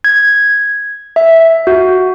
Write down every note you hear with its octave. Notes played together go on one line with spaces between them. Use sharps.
G#6
E5
F#4